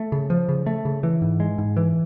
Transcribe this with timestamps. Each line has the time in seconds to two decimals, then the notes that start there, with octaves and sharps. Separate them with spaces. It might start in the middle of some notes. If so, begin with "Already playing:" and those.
Already playing: A3
0.12 C#3
0.30 F3
0.49 C#3
0.66 A3
0.85 C#3
1.03 E3
1.22 G#2
1.40 G#3
1.58 G#2
1.77 E3